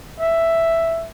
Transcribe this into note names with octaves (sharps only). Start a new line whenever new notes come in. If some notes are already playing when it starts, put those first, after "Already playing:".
E5